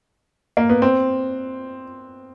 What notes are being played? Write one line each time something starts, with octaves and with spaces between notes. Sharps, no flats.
A#3
B3
C4